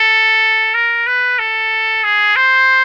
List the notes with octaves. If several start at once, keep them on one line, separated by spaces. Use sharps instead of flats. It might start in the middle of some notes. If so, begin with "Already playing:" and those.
Already playing: A4
A#4
B4
A4
G#4
C5